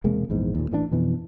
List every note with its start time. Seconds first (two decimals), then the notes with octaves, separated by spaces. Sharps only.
0.04 E1 C3 G#3 A#3
0.30 A#1 E2 G#2
0.55 D#2 A#2
0.71 A1 E3 G3 D4
0.91 F2 B2 E3